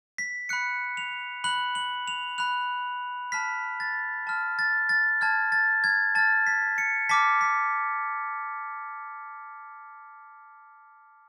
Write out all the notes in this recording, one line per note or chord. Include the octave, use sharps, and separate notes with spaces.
B6
B5 F#6 C#7
F7
B5 F#6 F#7
F#7
F7
B5 F#6 F7
A5 F6 B6
A6
A5 F6
A6
A6
A5 F6 G#6
A6
G#6
A5 F6 A6
B6
C#7
A5 D6 F6 B6
B6